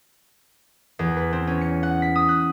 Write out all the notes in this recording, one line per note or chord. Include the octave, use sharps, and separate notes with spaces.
E2
B4
C4
C#4
C#7
F#5
B6
D#6
F#6